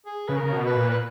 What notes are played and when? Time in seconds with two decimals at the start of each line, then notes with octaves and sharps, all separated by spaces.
0.06 G#4
0.28 C#3 B4
0.36 A#4
0.43 C#3
0.52 B2
0.67 B4
0.74 A#2
0.89 B4